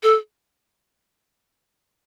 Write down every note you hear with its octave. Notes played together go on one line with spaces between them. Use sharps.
A4